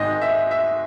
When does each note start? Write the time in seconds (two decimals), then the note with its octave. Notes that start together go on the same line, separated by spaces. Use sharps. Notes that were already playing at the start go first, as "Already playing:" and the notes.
Already playing: G#1 G#2 D#3 G#3 D#5
0.21 E5
0.51 E5